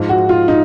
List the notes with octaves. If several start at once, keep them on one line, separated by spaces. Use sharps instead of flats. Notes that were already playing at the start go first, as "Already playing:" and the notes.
Already playing: G#2 F3
F#4
F4
D#4